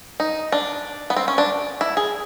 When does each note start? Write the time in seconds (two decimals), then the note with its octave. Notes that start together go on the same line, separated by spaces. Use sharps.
0.20 D#4
0.52 D4
1.10 B3
1.16 C4
1.28 C#4
1.38 D4
1.81 E4
1.97 G#4